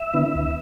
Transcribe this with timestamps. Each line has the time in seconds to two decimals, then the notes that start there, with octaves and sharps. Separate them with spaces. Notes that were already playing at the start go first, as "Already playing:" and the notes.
Already playing: E5
0.13 D3 B3 E4
0.35 D2